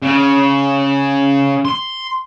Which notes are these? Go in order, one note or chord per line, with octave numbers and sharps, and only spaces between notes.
C#3
C6